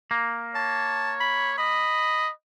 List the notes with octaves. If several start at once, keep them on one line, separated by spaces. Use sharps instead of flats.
A#3
C#5 A5
B5
D#5 B5